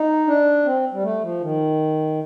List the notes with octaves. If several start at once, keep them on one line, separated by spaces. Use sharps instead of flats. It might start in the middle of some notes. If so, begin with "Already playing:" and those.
Already playing: D#4
D4
C4
G3
A3
F3
D#3